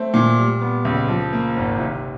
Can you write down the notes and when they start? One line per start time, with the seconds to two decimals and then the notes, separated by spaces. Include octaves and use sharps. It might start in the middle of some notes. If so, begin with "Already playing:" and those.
Already playing: A3 C4
0.14 A#2
0.39 G3
0.61 B3
0.85 C#2
1.08 F3
1.33 A#3
1.57 G#1
1.80 C3